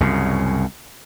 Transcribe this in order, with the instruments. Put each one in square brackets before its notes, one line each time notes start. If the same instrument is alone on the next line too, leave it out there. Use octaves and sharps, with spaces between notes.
[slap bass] C2 F#2 C#3